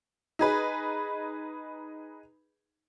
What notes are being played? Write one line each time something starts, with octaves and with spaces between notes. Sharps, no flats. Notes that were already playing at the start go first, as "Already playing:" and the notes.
D#4 G#4 B4